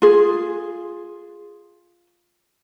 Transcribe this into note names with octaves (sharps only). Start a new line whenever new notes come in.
F4 G#4